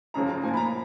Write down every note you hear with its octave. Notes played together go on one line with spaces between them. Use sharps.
F#2 C#3 F3 A#5
A#5
A#2 F3 G#5
B5
A#5